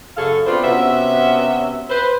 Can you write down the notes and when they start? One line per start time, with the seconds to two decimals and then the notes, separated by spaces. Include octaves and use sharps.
0.17 F#2 C#3 G#4 A4 C#5 F5
0.46 B3 C4 D4 F4 B4 C5
0.64 C3 B3 C#4 F#4 E5
1.89 B4 C5